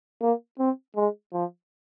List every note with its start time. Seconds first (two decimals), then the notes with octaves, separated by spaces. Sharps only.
0.22 A#3
0.59 C4
0.96 G#3
1.33 F3